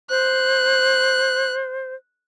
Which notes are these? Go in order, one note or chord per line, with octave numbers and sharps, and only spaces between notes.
C5 F#6